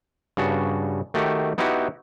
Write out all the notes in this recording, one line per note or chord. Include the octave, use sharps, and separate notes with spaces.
G2 C#3 F#4 A5
D#3 A3 F#4 G4
B3 D#4 E4 F#4 G4